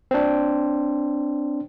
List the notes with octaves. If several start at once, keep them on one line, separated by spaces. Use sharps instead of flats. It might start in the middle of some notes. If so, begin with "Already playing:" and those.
C4 D4